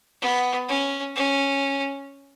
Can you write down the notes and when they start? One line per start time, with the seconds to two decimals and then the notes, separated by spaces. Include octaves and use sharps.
0.21 B3
0.68 C#4
1.15 C#4